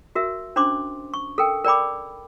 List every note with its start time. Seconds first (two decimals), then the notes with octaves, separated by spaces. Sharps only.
0.15 F#4 A#4 E5
0.56 C#4 D4 C5 G#5 C6 D6
1.14 C#6
1.38 A4 A#4 G5
1.65 A#4 D5 G5 B5 D6